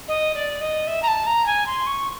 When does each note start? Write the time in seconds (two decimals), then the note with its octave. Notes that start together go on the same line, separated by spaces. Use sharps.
0.08 D#5
0.34 D5
0.60 D#5
0.87 E5
1.02 A#5
1.07 A5
1.26 A#5
1.46 G#5
1.66 C6
1.86 C#6